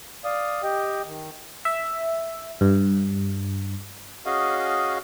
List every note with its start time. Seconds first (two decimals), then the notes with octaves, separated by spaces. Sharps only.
0.25 D5 F5 D#6
0.63 G4 D#5 G5
1.05 D#3
1.65 E5
2.61 G2
4.26 C#4 F#4 G#4 D#5 F5